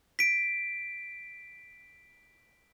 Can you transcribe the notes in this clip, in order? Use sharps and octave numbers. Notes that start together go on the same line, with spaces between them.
B6 D7